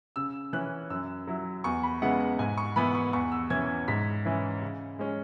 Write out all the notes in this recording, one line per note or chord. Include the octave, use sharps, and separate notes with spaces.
C#3 E6
E3 C#4 F#6
F#2 E6
F#3 E4
E2 C#6
B5
C#3 G#3 B3 E4 F#5
F#5
G#2 G#5
C#6
E3 B3 E4 B5
C#6
E2 C#6
E6
E3 C#4 E4 G#6
G#2 B6
E3 C#4 E4
C#3
G#3 C#4